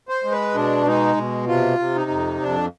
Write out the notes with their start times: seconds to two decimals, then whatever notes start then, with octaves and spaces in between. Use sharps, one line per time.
0.09 C5
0.24 G#3
0.32 B4
0.54 B2 D4
0.86 G#3 D#4
1.16 B2
1.48 C3 F4
1.79 C3
1.95 D#4
2.10 F2
2.41 F2 D4